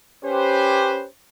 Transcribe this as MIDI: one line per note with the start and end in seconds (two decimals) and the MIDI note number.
0.24 1.05 61
0.24 1.05 67
0.24 1.05 71
0.24 1.05 72